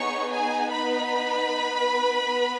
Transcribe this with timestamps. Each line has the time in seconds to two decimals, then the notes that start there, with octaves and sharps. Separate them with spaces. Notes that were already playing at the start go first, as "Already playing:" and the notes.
Already playing: B3 D#4 G#4 C#5 C#6
0.31 G#4 G#5
0.70 B4 B5
2.28 B3